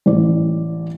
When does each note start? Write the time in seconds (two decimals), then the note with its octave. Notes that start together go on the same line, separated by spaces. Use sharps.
0.06 A1 D5